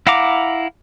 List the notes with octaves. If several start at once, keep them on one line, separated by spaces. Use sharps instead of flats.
E4 F5 F#5 A#5 D6